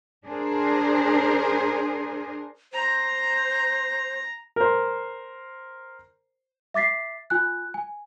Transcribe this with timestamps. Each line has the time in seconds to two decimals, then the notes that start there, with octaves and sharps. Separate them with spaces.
0.25 D4 G#4 A#4 C5
2.73 C5 A#5
4.56 A#4 C5
6.74 E5 D6 A6 B6 C7
7.30 F4 G#5 F#6
7.74 G#5